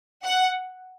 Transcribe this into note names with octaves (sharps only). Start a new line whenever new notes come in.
F#5